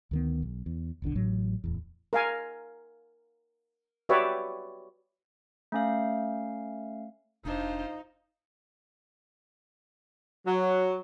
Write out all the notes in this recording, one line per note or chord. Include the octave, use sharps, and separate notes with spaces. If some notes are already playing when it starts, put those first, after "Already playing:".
D2 D#3 B3
B1
E2
D#1 B1 D3 D4
A1 A2 F#3
D1 E2
A#4 F5 G#5
F#4 G4 B4 C#5 D5 E5
A3 C#4 F5
F1 D4 D#4 F4 C5
F#3